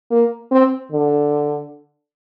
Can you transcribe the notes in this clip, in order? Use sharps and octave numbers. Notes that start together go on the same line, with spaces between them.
A#3
C4
D3